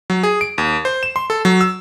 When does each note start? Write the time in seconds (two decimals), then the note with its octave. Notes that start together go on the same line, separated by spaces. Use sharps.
0.10 F#3
0.23 G#4
0.41 D7
0.58 D#2
0.85 C5
1.03 E7
1.16 C6
1.30 A4
1.45 F#3
1.61 E6